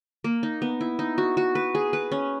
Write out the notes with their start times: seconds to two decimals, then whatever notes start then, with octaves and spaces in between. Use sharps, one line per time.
0.24 A#3
0.43 D#4
0.62 B3
0.81 E4
0.99 D#4
1.18 F#4
1.37 F#4
1.55 B4
1.75 G#4
1.93 B4
2.12 C#4